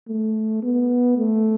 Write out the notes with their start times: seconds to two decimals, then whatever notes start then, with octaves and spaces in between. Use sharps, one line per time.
0.08 A3
0.63 B3
1.17 A3